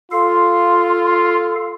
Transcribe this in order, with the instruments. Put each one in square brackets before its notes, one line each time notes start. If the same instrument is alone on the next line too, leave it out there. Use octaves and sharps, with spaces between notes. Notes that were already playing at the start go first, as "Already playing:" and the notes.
[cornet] F4 [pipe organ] A4 F5 [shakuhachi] C6